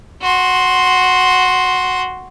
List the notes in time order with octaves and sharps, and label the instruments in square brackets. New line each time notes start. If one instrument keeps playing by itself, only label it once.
[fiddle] F#4 C6